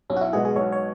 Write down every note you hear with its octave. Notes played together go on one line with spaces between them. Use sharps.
B1 C#4
F#4
E4
B2 G#3 B3 F#4 G#4
G#4
B1 C#5
C#5